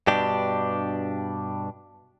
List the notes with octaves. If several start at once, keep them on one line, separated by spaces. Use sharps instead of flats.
G2 B2 D4 G4